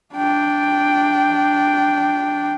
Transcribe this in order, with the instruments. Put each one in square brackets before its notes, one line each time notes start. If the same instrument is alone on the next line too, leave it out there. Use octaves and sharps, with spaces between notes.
[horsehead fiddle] D4 G5